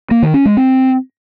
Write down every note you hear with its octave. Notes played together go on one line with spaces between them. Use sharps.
A#3
D#3
C#4
G#3
C4